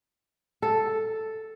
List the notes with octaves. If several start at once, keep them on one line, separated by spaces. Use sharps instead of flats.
A4